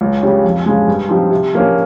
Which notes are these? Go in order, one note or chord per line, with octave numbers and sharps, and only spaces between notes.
C#2
C#3 G3 C#4 G4
F2
C#3 F3 G#3
G2
F3 C4 D#4 G4
C3
F3 A#3 C#4